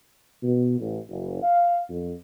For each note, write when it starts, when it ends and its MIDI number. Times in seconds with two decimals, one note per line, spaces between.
0.43 0.77 47
0.81 0.98 33
1.09 1.42 30
1.43 1.81 77
1.89 2.13 41